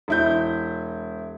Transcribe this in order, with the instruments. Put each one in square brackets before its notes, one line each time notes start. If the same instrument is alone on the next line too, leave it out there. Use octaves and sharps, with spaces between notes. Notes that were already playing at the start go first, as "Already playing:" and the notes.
[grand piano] E1 E4 G6